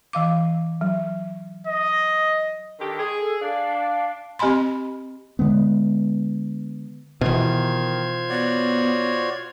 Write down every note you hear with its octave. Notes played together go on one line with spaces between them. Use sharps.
E3 F5 D6
F#3
D#5
D3 D#3 G4
G#4
A4
D4 F5
C4 G4 D#5 G#5 B5 C6
D3 G#3 B3
B2 D#3 E3 F4 C5 G#6
B3 F#4 C#5 D5